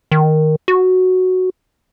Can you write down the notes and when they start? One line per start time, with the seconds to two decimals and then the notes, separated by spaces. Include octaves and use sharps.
0.12 D#3
0.68 F#4